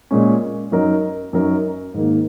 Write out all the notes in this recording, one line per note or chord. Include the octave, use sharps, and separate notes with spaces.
A#2 G#3 C#4
F#2 F#3 D#4 A#4
F#2 F#3 D#4 A#4
G#2 D#3 A#3